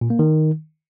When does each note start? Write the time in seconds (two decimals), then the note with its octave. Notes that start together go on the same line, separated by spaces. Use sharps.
0.01 A#2
0.10 A#3
0.19 D#3